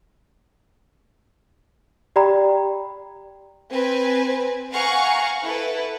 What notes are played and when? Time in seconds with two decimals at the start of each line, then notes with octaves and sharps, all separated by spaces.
2.16 G4 D5 G5 A#5 B5
3.71 C4 B4 G#5
4.72 F5 F#5 G#5 A#5 C#6
5.45 E4 A4 B4